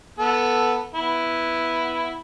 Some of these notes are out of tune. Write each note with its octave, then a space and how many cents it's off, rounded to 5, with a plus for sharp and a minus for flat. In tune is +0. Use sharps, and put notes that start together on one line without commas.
B3 -10 A4 +0
B3 +0 E4 +0